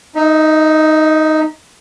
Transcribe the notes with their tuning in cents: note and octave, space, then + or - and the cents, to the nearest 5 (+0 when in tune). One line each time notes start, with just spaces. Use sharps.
D#4 +0 E5 -40